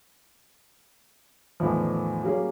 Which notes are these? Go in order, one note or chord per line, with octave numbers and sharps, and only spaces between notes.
E2 A2 D#3 F3
F#3 G3 A#3 C#4 G#4